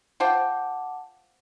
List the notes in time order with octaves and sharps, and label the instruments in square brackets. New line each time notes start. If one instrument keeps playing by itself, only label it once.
[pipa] F4 C5 G5 [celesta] F#5 A5 D6